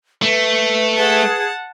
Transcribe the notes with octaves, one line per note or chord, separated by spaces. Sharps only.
A3 B4
G#4 F#5 A5